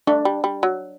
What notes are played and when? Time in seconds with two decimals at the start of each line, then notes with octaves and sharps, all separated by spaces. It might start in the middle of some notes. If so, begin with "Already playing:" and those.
0.07 A3 D4
0.25 G3
0.44 G3
0.63 F#3